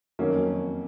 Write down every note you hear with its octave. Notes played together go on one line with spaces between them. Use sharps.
F2 D#3 F#3 A#3 C#4